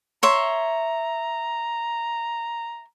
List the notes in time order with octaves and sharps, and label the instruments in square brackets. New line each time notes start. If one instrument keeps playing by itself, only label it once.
[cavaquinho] C#5 E5 C6 [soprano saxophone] A#5